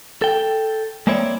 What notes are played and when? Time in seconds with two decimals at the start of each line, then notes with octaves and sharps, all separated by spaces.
0.22 A4 G5
1.07 G#3 A#3 C4 E4 C#5 D5